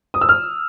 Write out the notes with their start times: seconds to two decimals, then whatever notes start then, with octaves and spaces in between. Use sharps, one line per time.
0.14 D#6
0.21 E6
0.29 F6